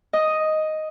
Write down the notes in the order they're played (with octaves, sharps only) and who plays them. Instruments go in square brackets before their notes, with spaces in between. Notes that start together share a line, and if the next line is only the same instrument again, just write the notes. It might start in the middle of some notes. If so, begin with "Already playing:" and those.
[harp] D#5